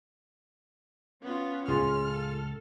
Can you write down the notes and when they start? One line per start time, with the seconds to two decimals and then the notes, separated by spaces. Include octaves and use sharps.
1.23 B3 C#4 F4
1.68 C#2 A2 F4 G#4 F6
2.06 A4